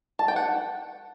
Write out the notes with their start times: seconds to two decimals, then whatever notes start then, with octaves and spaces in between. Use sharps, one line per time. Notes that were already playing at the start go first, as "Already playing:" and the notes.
0.19 A5
0.28 G5
0.36 F#5